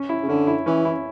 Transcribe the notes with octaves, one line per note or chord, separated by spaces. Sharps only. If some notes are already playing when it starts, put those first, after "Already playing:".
Already playing: C#4
E4
C#3
D3 C#4
E4
E3 C#4
E4